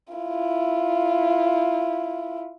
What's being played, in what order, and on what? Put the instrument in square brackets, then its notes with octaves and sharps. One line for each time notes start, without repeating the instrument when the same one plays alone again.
[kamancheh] E4 F4